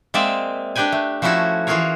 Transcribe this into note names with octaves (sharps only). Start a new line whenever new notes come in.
G#3 A#3 C4 D5 E5
D4 G4 B4 G5 G#5
A3
F3 A3 C#4 E4 F#4 A4
E3 F4 F#4 G#4 A#4 C#5